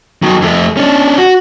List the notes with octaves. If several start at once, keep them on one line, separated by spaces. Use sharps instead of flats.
D#3 F#3
F2 A3
C#4 D4
F#4